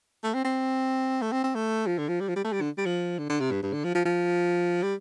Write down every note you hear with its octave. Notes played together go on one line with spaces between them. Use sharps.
A3
C4
C4
A3
C4
C4
A3
F3
D3
F3
G3
F3
G3
A3
G3
D3
G3
F3
D3
D3
C3
G2
G2
D3
F3
F3
F3
G3